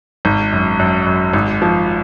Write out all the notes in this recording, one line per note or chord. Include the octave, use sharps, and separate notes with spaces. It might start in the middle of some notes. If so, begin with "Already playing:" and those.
G#1
F#2
F#2
F#2
G#1
F3